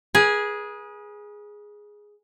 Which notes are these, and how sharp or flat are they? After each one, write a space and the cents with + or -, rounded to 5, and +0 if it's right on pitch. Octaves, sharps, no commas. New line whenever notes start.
G#4 +0 B4 -40